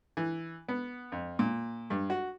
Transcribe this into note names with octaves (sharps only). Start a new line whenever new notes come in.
E3
B3
F2
A#2
G2
F#4